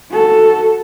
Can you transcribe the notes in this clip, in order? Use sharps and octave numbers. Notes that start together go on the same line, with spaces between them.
F#4 A4